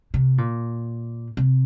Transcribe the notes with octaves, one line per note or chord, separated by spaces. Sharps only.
C3
A#2
C3